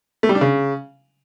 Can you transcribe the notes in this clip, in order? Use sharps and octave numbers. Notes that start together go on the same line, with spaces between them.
A3
G3
D4
C#3